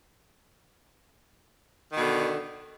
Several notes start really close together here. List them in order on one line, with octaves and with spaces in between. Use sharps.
D#3 B2 D3